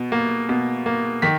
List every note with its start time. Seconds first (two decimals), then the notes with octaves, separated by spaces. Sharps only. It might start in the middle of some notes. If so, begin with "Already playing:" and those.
Already playing: B2
0.12 A#3
0.49 B2
0.86 A#3
1.22 D#3 B6